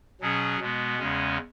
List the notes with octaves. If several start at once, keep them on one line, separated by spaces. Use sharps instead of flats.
B2 F#3 C#4 G#4
B2 G#3 B3
E2 C#3 G#3 C#4